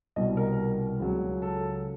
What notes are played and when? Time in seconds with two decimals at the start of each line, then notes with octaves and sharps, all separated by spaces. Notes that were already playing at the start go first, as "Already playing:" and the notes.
0.16 C2 B2 G3 D#5
0.37 A#4
1.00 C#2 C#3 F#3
1.42 A4